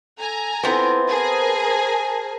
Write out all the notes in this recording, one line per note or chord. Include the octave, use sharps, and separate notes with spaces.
A4 G#5 A#5
B3 C4 E4 F4 A4
G#4 A#4 C5 G#5 A5